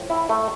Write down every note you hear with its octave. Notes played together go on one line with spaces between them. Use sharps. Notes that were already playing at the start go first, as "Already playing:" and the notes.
Already playing: A2 F3
E4
A3